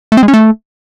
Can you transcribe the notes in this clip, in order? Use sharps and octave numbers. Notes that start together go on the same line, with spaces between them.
A3
C4
G#3
C#4
A3